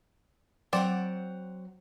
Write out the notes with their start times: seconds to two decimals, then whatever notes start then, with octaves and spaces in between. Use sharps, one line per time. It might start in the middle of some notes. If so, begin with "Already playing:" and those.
0.73 F#3 C4 D5 F#5 A#5